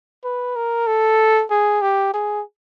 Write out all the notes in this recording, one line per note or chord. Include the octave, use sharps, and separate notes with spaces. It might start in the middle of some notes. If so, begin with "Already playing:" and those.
B4
A#4
A4
G#4
G4
G#4